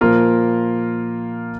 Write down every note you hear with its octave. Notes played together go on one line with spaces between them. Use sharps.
A#2 F3 A#3 F4 A#4